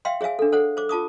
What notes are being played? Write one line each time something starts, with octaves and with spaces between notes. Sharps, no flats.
E5 F5 G5 C6
G#4 C#5 E5 F5 G#5
D4 A4
A4 C5 C#5 F#5
C5 D6
F4 A5 D6 D#6